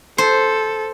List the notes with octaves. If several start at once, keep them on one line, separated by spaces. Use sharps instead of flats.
A4 C5